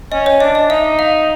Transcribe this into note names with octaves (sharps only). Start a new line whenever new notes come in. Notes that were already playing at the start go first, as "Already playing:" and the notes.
C#4 D#5
C#5
D4 D#5
D#5
D#4 E5
F5